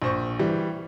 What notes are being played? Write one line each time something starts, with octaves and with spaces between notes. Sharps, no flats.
A#1 C5 C#6
E3 G3